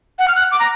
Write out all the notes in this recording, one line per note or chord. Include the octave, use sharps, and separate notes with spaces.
F#5
F6
F#6
D6
A#5